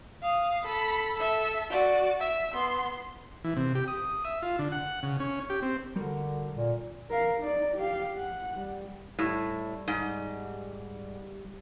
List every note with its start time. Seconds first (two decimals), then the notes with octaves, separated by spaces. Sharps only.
0.22 F5 D#6
0.65 A4 B5
1.16 A4 E5
1.70 F#4 D5
2.19 E5
2.52 B3 C6
3.44 E3
3.57 C3
3.75 G4
3.88 D#6
4.25 E5
4.42 F4
4.59 D3
4.72 F#5
5.03 C#3
5.20 C#4
5.50 G4
5.62 C4
5.96 D3 G3 F#4 A#4
6.53 A#2
7.10 A#4 F5
7.40 D#4 D5
7.75 G4 F5
8.16 F#5
8.56 G3
9.19 A2 G3
9.88 G#2